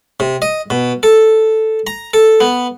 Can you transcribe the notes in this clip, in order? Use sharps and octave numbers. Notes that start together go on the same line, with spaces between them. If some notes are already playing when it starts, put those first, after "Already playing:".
C3
D#5
B2
A4
A#5
A4
B3